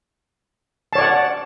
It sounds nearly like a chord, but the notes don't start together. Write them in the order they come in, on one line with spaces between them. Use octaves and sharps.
A5 C#5 D5 F#5